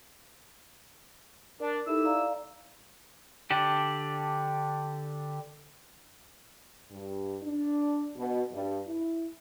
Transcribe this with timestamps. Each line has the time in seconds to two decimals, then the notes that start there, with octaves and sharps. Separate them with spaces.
1.60 D4 A#4
1.86 D#4 E4 G4 A4 E6
2.05 D5 F5 A#5
3.50 D3 D4 G4
6.91 G2
7.43 D4
8.17 B2
8.51 G2
8.87 E4